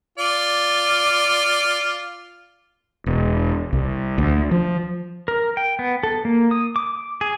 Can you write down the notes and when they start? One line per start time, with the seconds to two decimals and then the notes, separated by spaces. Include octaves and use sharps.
0.18 F4 D5
3.06 E1
3.73 C2
4.18 D2
4.51 F3
5.28 A#4
5.57 G5
5.79 B3
6.03 A4
6.25 A#3
6.51 D#6
6.76 D6
7.21 G#4